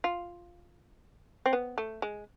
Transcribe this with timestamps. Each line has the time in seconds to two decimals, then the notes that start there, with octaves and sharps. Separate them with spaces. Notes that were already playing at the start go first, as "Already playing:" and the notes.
0.04 F4
1.46 C4
1.53 B3
1.78 A3
2.02 G#3